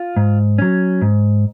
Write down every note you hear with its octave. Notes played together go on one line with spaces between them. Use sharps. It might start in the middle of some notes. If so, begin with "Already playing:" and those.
Already playing: F4
G#2
F#3 C#4
G#2